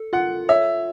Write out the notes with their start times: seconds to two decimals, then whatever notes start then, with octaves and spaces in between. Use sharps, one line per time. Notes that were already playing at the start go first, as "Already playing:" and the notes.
Already playing: A4
0.13 F4 F#5
0.49 C#5 E5